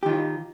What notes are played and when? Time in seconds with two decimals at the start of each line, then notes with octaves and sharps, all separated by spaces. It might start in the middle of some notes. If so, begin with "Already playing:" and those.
0.03 G4
0.06 D#3
0.09 F4